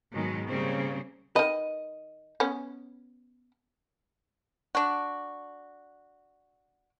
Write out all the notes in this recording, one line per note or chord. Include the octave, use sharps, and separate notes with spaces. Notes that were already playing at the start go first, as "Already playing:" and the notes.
G#2 B2 D#3 F#3 G#3
C#3 G3 A#3 C4
D#3 B4 D#5
B3 C#4
D4 F#4